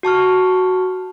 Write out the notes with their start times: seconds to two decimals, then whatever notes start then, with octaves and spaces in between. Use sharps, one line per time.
0.03 F#4 A5 C#6 F6